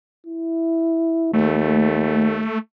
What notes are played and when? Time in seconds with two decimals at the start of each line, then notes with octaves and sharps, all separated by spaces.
0.26 E4
1.33 D#2 A3